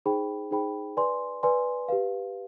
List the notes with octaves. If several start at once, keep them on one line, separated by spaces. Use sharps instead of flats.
D#4 G#4 C5 G5 B5
D#4 G#4 C5 G5 B5
B4 D5 G#5 C6
B4 D5 G#5 C6
G4 B4 F5